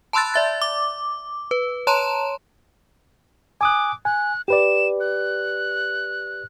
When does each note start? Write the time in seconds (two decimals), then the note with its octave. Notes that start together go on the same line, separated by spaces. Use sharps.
0.13 A5 B5 C6 E6 F#6 A6
0.34 D5 E5 A6
0.62 D6
1.51 B4
1.87 C#5 A5 A#5 C6 E7
3.61 G#5 D6 D#6 F#6
4.05 G#5 F#6
4.48 G4 B4 D5 E7
5.00 F#6